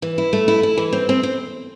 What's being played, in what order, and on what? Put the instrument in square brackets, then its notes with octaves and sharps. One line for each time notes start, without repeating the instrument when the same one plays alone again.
[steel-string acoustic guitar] E3
E4
A3
E4
E4
E3
C4
C4
C4